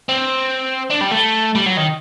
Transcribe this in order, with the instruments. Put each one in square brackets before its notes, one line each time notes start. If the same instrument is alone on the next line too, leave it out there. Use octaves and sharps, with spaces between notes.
[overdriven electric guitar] C4
D4
G3
A3
G3
F#3
D#3